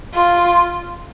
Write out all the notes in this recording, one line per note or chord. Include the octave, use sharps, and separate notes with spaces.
F4